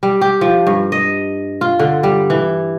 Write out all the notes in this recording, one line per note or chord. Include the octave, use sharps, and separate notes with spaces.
G3
G4
F3
G2
D#5
F4
D3
G3
E3